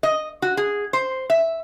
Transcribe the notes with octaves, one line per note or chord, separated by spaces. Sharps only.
D#5
F#4
G#4
C5
E5